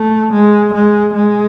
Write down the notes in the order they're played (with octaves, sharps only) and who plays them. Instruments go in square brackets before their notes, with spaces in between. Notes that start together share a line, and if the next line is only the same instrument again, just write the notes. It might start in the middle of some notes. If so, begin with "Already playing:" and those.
Already playing: [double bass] A3
G#3
G#3
G#3